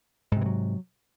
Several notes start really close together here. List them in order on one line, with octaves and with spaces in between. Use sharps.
G#2 C3 E3 F#3